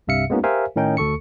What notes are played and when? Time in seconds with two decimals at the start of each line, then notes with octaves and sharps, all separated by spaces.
0.07 C2 G2 C3 E5 F5 C#7
0.30 G#3 A#3 B3 C#4 D#4 F#4
0.43 G4 A#4 C5 E5 F5 G#5
0.76 A2 D#3 C#4 D#4 G5
0.97 D2 A4 C#6 C#7